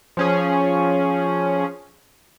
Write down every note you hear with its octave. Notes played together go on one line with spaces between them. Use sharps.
F3 C#4 G#4